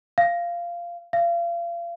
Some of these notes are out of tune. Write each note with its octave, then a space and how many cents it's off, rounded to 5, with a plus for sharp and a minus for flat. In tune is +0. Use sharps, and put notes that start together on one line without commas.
F5 -15
F5 -35